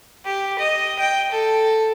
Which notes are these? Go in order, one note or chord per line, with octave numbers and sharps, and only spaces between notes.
G4
D#5
G5
A4